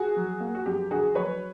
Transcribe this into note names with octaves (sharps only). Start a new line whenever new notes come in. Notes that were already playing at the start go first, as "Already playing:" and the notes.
Already playing: F#4 G#4
F#3
A#3
F#4
F#2 G4
D3 F#4 G#4
F#3 B4 C#5